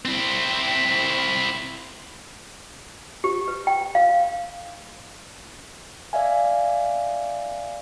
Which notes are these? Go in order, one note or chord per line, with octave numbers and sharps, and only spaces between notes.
C4 E4
G4
B4
G5
F5
D5 E5 F5 G#5